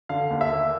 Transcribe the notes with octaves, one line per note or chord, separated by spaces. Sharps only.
D3 F5
D#2
E5
A#3